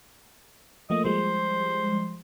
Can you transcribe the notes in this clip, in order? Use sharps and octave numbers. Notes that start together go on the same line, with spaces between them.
F3 A3 A#3 D#5
F3 G3 G#3 C5